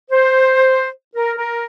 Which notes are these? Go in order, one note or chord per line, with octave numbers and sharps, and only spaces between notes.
C5
A#4
A#4